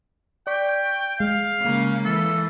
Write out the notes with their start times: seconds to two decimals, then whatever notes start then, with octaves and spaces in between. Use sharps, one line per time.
0.47 D5 G5 C#6 B6
1.20 G#3 F5
1.61 C#3 A#3
2.05 E3 A4